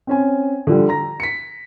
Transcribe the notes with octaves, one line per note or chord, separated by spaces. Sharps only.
C4 C#4 G#5
D3 F3 G3
A#5 A#6
B6 C#7